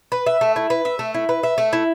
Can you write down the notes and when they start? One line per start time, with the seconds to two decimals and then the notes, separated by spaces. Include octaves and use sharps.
0.12 B4
0.26 E5
0.41 A3
0.56 E4
0.70 B4
0.85 E5
0.99 A3
1.14 E4
1.29 B4
1.43 E5
1.58 A3
1.73 E4